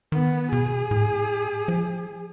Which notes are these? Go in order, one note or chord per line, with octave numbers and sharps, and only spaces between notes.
D#3 B3
B2 G#4
A2
F3